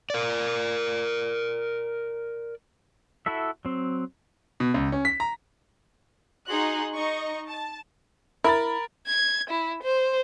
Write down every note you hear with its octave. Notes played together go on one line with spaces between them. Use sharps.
A#4 D5
E4 F#4 A4 E5
F#3 C4
B2
C#2
C#4
B6
A#5
D#4 F#4 G#4 C6 F#6
D#4 D#5 C#6
A5
E4 A#4 B5 A6
G#6
E4
C5